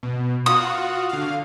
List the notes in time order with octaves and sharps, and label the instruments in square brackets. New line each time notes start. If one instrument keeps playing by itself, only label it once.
[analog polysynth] B2
[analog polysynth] F4 F#4 F#5 [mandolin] D#6
[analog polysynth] D3 F5